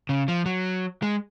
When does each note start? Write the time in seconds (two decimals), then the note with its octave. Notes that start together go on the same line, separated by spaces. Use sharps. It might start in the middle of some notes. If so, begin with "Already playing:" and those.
0.09 C#3
0.28 F3
0.46 F#3
1.02 G#3